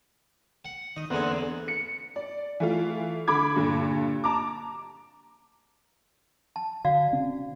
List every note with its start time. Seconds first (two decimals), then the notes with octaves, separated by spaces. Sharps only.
0.65 F#5
0.96 D#3 D#5
1.10 E2 D3 A#3 C4 G#4 F#5
1.68 C#7
2.16 D5
2.60 E3 A3 F4
3.27 D3 B5 D6 G#6
3.56 G2 A#2 D3
4.24 A5 A#5 D6
6.56 A5
6.85 D3 F#4 D5 F5
7.12 C#3 C4 C#4